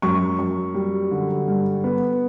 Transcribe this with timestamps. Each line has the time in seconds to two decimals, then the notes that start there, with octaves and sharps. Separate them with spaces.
0.02 F#2 C#6
0.39 F#2
0.74 G3
1.11 D3
1.48 G2
1.84 B3